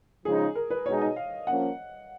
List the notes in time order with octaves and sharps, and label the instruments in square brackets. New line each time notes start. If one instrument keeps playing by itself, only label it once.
[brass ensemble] C#3 F3 G#3 D#4 [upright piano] G#4
[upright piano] A#4
B4
[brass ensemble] B2 G#3 D#4 G#4 [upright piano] C#5
[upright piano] D#5
F5
[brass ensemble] F3 A#3 C#4 [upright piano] F#5